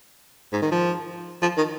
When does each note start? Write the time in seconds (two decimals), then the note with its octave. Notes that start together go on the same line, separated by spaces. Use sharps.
0.53 G#2
0.62 D#3
0.72 F3
1.42 F3
1.57 D#3